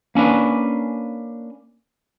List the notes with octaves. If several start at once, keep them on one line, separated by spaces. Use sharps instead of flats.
A#3 C#4 D4 B4